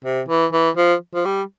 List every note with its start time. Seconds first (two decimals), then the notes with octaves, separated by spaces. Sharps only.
0.04 C3
0.29 E3
0.53 E3
0.77 F3
1.14 F3
1.25 G3